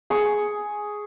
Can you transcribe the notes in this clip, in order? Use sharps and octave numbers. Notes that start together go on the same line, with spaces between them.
G#4 C#6